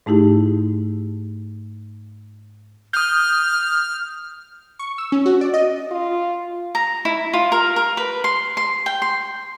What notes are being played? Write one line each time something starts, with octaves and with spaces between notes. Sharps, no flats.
G#2 A3 D#4 E4 G4
D#6 F6 G6
C#6
E6
C#4
F#4
D5
D#5
F4
A#5
E4
F4
A#4
A#4
B4
C6
C6
G5
C6